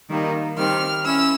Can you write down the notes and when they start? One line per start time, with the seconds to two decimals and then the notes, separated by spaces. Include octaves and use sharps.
0.09 D#3 G3 A#3 D#4
0.57 D#3 G3 C4 F6
1.05 C#4 E4 E6